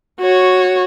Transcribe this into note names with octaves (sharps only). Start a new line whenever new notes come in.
F#4 C#5